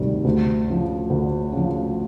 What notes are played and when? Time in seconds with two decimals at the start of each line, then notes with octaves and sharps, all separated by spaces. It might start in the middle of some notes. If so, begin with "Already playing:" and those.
Already playing: D2 C3 D#3 G3
0.25 D2
0.67 C#3 F3
1.10 D2
1.52 C#3 F3